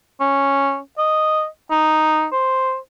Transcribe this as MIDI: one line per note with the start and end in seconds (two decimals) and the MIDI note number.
0.20 0.79 61
0.98 1.46 75
1.71 2.26 63
2.32 2.77 72